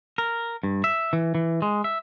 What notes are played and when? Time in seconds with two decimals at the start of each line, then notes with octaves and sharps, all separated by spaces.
0.18 A#4
0.63 G2
0.84 E5
1.13 E3
1.35 E3
1.62 G#3
1.84 E5